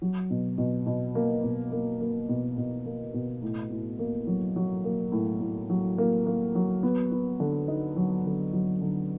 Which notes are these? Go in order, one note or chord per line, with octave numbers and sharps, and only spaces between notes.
F#3
B2
B2
B2
A#3
B2
A#3
A#3
B2
B2
A#3
B2
A2
A2
A#3
F#3
F#3
A#3
A2
A2
F#3
A#3
A#3
F#3
B3
B3
D3
D#4
F#3
D3
F#3
D3